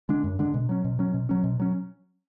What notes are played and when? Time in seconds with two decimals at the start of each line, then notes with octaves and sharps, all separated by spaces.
0.09 D3 G#3 D4
0.24 F#2
0.39 D3 G#3 D4
0.54 B2
0.69 F#3 C#4
0.85 B2
0.99 F#3 C#4
1.14 B2
1.29 F#3 C#4
1.44 B2
1.60 F#3 C#4